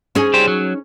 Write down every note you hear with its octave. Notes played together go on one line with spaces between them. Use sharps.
C#4 D#4 G#4
G3 G4 C5
F#3